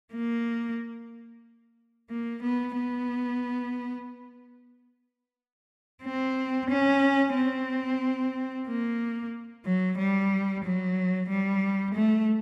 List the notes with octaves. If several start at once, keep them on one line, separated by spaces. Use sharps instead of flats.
A#3
A#3
B3
B3
C4
C#4
C4
A#3
F#3
G3
F#3
G3
A3